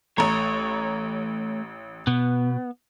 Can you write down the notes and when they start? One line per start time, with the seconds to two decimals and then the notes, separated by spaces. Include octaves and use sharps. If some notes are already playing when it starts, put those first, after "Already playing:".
0.18 A1 A3 C#5 A#5
2.07 B2 B3